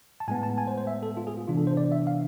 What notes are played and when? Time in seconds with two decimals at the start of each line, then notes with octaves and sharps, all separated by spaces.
0.20 A5
0.28 A2 G#3 B3 G#5
0.43 A5
0.58 G#5
0.67 C5
0.78 C5
0.87 E5
1.03 A4
1.17 F4
1.27 G#4
1.37 F4
1.47 C3 E3 B3 D4 F4
1.57 A4
1.67 C5
1.77 D5
1.92 E5
2.07 F5